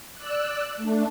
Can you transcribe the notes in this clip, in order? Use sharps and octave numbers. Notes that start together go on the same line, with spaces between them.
D5 E6 F#6
A3 D4